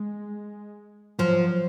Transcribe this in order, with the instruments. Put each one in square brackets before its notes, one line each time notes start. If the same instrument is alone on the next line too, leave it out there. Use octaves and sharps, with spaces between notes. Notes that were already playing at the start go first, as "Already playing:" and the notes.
Already playing: [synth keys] G#3
[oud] F3 [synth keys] F#3